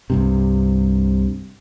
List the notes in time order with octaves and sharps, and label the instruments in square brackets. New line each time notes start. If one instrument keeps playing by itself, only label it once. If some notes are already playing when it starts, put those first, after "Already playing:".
[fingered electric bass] C2 G2 C3